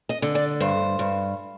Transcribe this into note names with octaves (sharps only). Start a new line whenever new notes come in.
D#5
D3
D5
G2 C5
G2